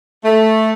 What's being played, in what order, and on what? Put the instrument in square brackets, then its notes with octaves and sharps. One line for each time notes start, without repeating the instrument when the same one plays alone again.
[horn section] A3